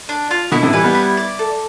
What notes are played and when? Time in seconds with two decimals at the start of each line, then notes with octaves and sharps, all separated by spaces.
0.09 D4
0.31 F4
0.52 B2 D3 E4
0.63 A2 C3
0.73 E3 G3 B4
0.84 G3 B3
0.95 E4
1.17 D5
1.39 A4